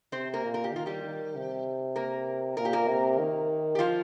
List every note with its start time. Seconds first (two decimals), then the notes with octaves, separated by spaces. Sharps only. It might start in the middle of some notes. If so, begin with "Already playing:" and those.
0.12 C3 C4 C5
0.33 A#3 A#4
0.44 A#2
0.54 A#4
0.64 G4
0.73 D#3 F4
0.86 G3 G4
1.05 D#3
1.35 C3
1.96 A#3 A#4
2.57 A#2 A#4
2.65 G4
2.73 A#3 A#4
2.88 C3
3.19 D#3
3.75 G4
3.79 F3 F4